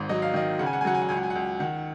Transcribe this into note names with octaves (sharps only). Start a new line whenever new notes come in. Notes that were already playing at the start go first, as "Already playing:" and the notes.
Already playing: G#1 G#2
F#3 D#5
F5
D#3 D#5
C#3 F#5
G#5
F#5
G#5
F#3 F#5
G#5
F#5
C#2 G#5
F#5
G#5
F#5
C#2
D#3 F#5